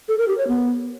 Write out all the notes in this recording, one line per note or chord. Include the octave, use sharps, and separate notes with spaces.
A4
A#4
G4
C#5
B3